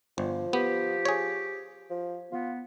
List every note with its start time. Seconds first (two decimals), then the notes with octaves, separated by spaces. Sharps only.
0.18 G1 F3
0.53 B3 G4
1.05 G#4 C#5
1.90 F3
2.32 B3 F4